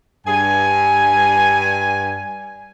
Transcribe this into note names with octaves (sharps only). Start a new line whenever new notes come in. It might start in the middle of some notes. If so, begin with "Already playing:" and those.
G2 G#5